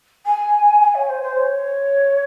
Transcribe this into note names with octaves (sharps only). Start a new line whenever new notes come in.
G#5
G#5
C#5
C5
C5
C#5